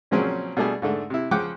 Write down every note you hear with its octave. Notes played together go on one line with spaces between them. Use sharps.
A#2 C#3 F3 F#3 C4 C#4
B2 G3 A3 D4 G#4 A4
G#2 D3 A3
C3 E4
C#3 F3 F#5 G5 D6 F#6